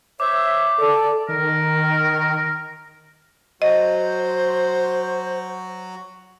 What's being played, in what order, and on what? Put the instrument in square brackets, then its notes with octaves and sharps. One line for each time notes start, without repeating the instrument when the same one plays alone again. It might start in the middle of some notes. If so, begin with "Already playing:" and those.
[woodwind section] C5 C#5 E5 [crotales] D6
[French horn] A4 [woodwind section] D5
[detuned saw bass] D#3 [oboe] A#4
[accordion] F#3 F#4 [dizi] C5 [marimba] D#5